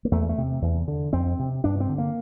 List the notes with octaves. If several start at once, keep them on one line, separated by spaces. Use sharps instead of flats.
A#3
E2 A3
A3
C3
E2
D3
F2 C4
C3
G2 D4
C4
D3
A#3